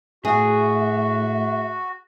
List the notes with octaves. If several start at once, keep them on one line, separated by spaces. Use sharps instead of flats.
A2 F#4 G#4 E5